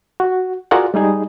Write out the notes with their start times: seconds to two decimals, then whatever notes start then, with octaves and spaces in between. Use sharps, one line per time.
0.20 F#4
0.71 F4 F#4 G#4 A#4 D5 F#5
0.94 G3 G#3 D#4 G#4